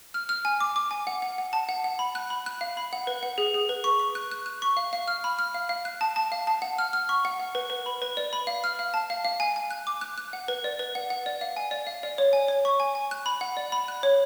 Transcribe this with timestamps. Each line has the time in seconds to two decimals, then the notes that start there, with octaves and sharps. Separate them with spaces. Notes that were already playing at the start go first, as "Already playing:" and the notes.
0.14 F6
0.29 F6
0.45 G#5
0.60 D6
0.76 D6
0.91 G#5
1.07 F#5
1.22 F#5
1.38 F#5
1.53 A5
1.69 F#5
1.84 F#5
1.99 B5
2.15 F#6
2.30 B5
2.46 F#6
2.61 F5
2.77 B5
2.93 F#5
3.07 B4
3.23 F#5
3.38 G#4
3.54 G#4
3.69 B4
3.84 C#6
3.99 C#6
4.15 F#6
4.31 F#6
4.46 F#6
4.62 C#6
4.77 F5
4.93 F5
5.08 F6
5.24 B5
5.39 F6
5.54 F5
5.69 F5
5.85 F#6
6.01 A5
6.16 A5
6.32 F5
6.47 A5
6.62 F#5
6.78 F6
6.93 F6
7.09 C#6
7.25 F#5
7.40 F#5
7.55 B4
7.70 B4
7.86 B5
8.02 B4
8.17 D5
8.33 B5
8.47 F5
8.64 F6
8.79 F5
8.94 A5
9.10 F5
9.25 F5
9.40 G#5
9.56 G#5
9.71 F#6
9.87 D6
10.01 F#6
10.18 F#6
10.33 F#5
10.48 B4
10.64 D5
10.79 B4
10.95 F#5
11.10 F#5
11.26 D5
11.41 F5
11.56 G#5
11.71 D5
11.87 F5
12.03 D5
12.18 C#5
12.33 G#5
12.48 C#5
12.65 C#6
12.80 G#5
12.95 G#5
13.11 F#6
13.26 B5
13.41 F#5
13.57 D5
13.72 B5
13.88 F#6
14.03 C#5